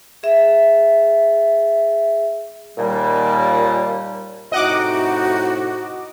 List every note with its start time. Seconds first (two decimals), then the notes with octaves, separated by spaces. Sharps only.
0.23 G#4 E5
2.78 D#2 A#2 G3
4.52 A2 C3 D#4 F#4 D#5 F#5 D6